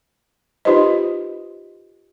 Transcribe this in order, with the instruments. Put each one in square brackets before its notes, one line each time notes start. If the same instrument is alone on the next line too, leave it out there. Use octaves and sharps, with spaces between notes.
[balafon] D#4 F4 G4 B4 C5 D#5